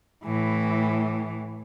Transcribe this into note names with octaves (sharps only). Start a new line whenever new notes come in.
A2 E3